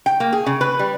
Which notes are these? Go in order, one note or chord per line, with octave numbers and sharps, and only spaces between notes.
G5
A#3
G#4
C#3
B4
G3